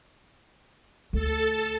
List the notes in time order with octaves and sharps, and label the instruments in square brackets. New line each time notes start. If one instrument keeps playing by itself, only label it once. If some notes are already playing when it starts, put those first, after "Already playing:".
[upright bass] D2 [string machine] A4 A5